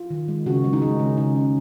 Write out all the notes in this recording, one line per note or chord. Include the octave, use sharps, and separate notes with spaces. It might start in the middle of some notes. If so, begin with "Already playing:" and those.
Already playing: F4
D#3
G#3
C#3 F#4
G#3
D#4
G#3
C#3 C#4
C#3 D#4
G#3 C#4